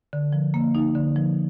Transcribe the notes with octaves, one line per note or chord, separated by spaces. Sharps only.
D3
F3
A#3
D#4
D3
F3